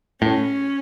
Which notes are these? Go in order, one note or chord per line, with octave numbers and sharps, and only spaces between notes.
A2 C#4